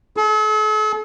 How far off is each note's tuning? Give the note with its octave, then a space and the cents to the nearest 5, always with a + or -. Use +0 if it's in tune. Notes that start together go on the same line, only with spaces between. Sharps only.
A4 -45